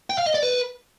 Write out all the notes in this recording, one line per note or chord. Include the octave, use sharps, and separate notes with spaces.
G5
F5
D#5
D5
B4